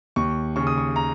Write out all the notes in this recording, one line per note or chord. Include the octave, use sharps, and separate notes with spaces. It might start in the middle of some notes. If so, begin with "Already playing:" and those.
D#2 C#6
C#3 C#6
D#6
C#6
A#5